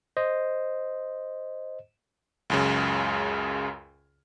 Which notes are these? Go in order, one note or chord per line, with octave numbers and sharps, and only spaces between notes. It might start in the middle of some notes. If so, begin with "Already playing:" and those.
C5 D#5
C#2 F#2 C#3